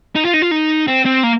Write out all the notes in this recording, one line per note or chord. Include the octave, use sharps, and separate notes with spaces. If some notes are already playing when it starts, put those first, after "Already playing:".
D#4
F4
D#4
F4
D#4
C4
C4
A#3